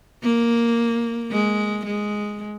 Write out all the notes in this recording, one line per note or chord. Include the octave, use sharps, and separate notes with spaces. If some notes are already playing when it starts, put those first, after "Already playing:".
A#3
G#3
G#3